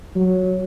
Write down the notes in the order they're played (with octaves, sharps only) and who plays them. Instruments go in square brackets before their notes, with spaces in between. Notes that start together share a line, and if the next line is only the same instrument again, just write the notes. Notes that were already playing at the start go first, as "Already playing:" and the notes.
[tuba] F#3